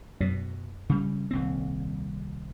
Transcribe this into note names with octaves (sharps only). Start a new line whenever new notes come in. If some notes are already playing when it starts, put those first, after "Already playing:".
F#2 B2
C#3 G3
D#1 C2 C4